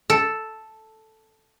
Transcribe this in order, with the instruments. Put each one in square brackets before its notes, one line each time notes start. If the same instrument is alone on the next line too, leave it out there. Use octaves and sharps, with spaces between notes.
[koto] A4